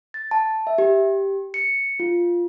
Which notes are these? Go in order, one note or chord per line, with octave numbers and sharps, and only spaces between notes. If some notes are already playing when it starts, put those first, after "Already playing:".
A6
A5
E5
G4
C#7
F4